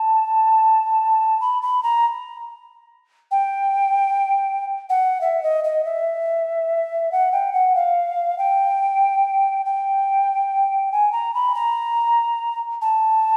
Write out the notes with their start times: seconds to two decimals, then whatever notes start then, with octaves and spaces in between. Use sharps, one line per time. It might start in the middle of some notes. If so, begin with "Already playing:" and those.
Already playing: A5
1.41 B5
1.62 B5
1.83 A#5
3.31 G5
4.90 F#5
5.21 E5
5.43 D#5
5.64 D#5
5.85 E5
7.12 F#5
7.32 G5
7.53 F#5
7.75 F5
8.38 G5
9.66 G5
10.92 G#5
11.12 A#5
11.34 B5
11.55 A#5
12.82 A5